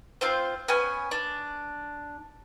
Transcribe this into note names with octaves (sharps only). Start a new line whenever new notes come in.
C4 F4 C5
B3 C#4 G#5
D4